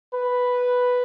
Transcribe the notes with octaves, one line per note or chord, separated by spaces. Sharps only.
B4